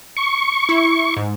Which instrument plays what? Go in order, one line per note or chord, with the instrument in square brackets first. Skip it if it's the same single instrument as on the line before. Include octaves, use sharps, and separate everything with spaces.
[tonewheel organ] C#6
[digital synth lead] E4
G#2